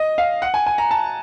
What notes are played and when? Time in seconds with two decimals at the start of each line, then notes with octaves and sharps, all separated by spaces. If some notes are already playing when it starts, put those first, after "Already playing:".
Already playing: D#5
0.18 F5
0.42 F#5
0.54 G#5
0.66 G#5
0.78 A#5
0.91 A5